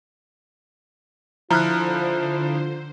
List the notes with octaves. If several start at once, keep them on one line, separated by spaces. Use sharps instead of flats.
D3 F3 E4 F4 C5 A#5 F6 F#6